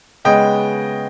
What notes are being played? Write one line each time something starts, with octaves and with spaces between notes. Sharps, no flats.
C#3 G#3 B3 D#5 G5